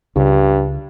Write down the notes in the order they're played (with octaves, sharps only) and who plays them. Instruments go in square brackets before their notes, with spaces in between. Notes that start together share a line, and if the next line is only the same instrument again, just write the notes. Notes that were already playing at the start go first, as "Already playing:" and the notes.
[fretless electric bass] C#2 C#3 [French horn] G2